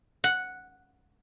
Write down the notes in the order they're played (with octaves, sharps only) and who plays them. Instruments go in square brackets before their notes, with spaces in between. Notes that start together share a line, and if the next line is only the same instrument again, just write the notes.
[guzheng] F#5